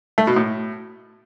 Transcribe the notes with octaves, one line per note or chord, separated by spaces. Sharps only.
A3
B2
A2